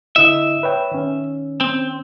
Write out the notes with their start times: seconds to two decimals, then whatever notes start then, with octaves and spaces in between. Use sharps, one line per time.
0.16 D3 E4 D#5 E5
0.63 B4 C#5 G5
0.91 D#3 C#4
1.61 C4